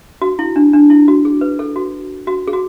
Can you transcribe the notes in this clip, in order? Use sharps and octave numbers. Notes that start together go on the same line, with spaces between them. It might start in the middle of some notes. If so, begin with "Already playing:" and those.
F#4
E4
D4
D4
E4
F#4
G#4
B4
A4
F#4
F#4
G#4
F#4